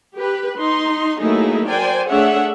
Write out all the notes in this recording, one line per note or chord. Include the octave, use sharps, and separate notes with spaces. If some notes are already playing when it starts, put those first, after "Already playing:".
G4 B4
D#4 C6
F#3 A3 A#3 D#4 E4 G#4
A#4 C5 D5 G5 G#5
A3 D4 G#4 C#5 E5 F#5